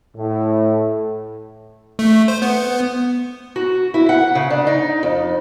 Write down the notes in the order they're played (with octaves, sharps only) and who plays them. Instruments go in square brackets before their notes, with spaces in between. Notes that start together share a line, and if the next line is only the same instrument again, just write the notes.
[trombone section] A2
[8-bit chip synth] A3
C5
B3
[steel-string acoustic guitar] F#4
E4
F#5
C#3
D4
D#4
F2